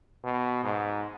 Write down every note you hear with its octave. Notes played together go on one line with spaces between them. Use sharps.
B2
G#2